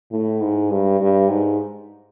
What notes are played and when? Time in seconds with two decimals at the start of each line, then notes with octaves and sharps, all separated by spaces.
0.11 A2
0.41 G#2
0.70 G2
1.00 G2
1.30 G#2